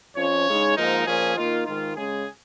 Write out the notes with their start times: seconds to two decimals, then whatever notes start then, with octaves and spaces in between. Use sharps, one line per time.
0.16 F2 F3 C#4 C#5
0.47 C#3 G#3 D#4
0.77 G#2 F3 A#3 D#4 A#4
1.06 A#2 F3 A#3 C#4 G#4
1.36 D#3 A#3 D#4 F4
1.66 G#2 D#3 G#3 F4
1.96 C#3 G#3 C#4 G#4